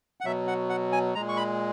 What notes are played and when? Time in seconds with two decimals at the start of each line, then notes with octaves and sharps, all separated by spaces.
0.21 F#5
0.25 B2 F#3 E5
0.47 F#5
0.70 F#5
0.92 G#5
1.15 A#2 G#3 A#5
1.29 C#6
1.37 B5